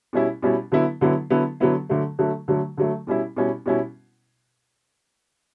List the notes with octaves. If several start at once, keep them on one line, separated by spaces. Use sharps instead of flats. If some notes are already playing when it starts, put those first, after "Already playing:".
B2 G3 C#4 E4
B2 G3 C#4 E4
D3 F#3 B3 E4
D3 F#3 B3 E4
D3 F#3 B3 E4
D3 F#3 B3 E4
D3 F#3 A3
D3 F#3 A3
D3 F#3 A3
D3 F#3 A3
B2 G3 C#4 E4
B2 G3 C#4 E4
B2 G3 C#4 E4